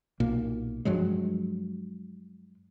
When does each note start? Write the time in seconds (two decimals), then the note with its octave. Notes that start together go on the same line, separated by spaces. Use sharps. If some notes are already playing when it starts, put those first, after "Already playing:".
0.20 B1 A#2 A#3
0.85 G2 F3 F#3 G#3